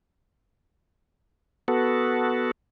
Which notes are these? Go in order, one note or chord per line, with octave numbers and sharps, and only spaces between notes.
B3 F#4 A4